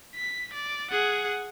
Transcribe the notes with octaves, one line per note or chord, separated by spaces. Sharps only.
B6
D5
G#4 F#5